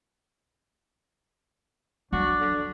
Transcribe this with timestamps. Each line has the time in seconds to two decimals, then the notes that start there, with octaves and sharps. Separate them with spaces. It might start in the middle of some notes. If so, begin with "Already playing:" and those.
2.13 F#3 D4 F#4
2.40 D3